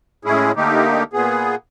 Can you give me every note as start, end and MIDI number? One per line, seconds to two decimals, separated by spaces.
0.25 0.52 45
0.25 0.52 56
0.25 0.52 61
0.25 0.52 64
0.25 0.52 68
0.56 1.03 50
0.56 1.03 57
0.56 1.03 58
0.56 1.03 63
0.56 1.03 67
1.13 1.55 46
1.13 1.55 59
1.13 1.55 68